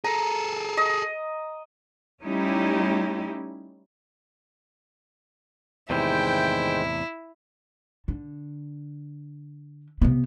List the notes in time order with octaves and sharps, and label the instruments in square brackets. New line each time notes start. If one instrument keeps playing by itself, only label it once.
[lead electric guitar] G#4 A4 [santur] A#5
[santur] D#5
[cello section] G3 A3 C#4 D#4 E4 G4
[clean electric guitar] E2 A2 C3 [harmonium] D#3 G#3 C5 [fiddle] E4 [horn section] G5
[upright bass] D3
C3 B3